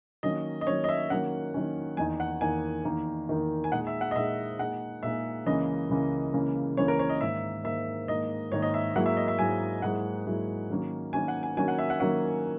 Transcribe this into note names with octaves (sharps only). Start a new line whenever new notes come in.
D#3 F#3 A#3 C#4 D#5
D#5
D#3 F#3 A#3 C#4 C#5
D#5
E5
D#3 F#3 A#3 C#4 F#5
D#3 F#3 A#3 C#4
E2 D#3 A#3 D#4 G#5
F#5
E2 D#3 A#3 D#4 G#5
E2 D#3 A#3 D#4
E2 D#3 A#3 D#4
G#5
A#2 G#3 D#4 G#4 F#5
E5
F#5
D#5
A#2 G#3 D#4 G#4 E5
A#2 G#3 D#4 G#4 F#5
A#2 G#3 D#4 G#4 E5
C#2 C#3 E3 A#3 C#4 D#5
C#2 C#3 E3 A#3 C#4
C#2 C#3 E3 A#3 C#4
C#2 C#3 E3 A#3 C#4 C#5
A#4
C#5
D#5
G#2 D#3 A#3 E5
G#2 D#3 A#3 E5
G#2 D#3 A#3 D#5
G#2 D#3 A#3 C#5
D#5
E5
G#2 F#3 A#3 E4 G#4 F#5
E5
D#5
E5
G#2 F#3 A#3 E4 G#4 G#5
G#2 F#3 A#3 E4 G#4 F#5
G#2 F#3 A#3 E4 G#4
D#3 F#3 A#3 C#4 F#4
D#3 F#3 A#3 C#4 F#4 G#5
F#5
G#5
D#3 F#3 A#3 C#4 F#4 G#5
F#5
E5
F#5
D#3 F#3 A#3 C#4 F#4 F#5